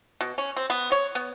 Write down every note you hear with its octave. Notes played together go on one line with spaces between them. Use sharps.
B2
C#4
C4
B3
C#5
B3